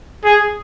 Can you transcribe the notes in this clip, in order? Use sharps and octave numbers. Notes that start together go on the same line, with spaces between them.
G#4